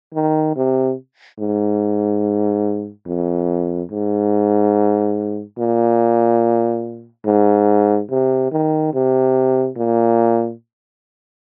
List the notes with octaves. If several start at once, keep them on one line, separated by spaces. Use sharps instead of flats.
D#3
C3
G#2
F2
G#2
A#2
G#2
C3
D#3
C3
A#2